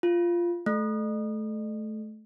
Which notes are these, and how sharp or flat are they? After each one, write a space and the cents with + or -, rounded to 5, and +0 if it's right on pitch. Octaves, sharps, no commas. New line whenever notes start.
F4 -10
A3 -25